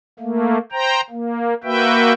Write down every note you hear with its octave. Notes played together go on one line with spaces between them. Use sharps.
A3 A#3
C5 G5 A#5
A#3
A#3 F#4 B4 E5 G5